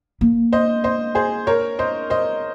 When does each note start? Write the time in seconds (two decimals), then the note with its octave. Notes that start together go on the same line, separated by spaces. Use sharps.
0.21 A#3
0.53 C5 D#5
0.84 C5 D#5
1.15 G#4 C5
1.47 A#4 C#5
1.79 C5 D#5
2.10 C5 D#5